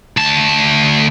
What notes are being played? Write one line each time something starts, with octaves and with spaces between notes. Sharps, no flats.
D2 A5